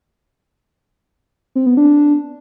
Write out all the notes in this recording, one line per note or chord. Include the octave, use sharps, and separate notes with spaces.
C4
B3
D4